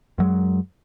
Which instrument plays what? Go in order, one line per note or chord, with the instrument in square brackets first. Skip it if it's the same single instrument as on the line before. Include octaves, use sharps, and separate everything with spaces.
[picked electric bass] F#2 F#3 G#3